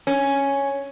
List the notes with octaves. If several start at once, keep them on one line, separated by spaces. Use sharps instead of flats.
C#4